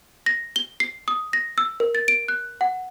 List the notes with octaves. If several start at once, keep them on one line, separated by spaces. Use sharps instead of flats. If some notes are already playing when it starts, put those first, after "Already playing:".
A#6
G7
C7
D#6
A#6
E6
A#4
A6
D7
F#6
F#5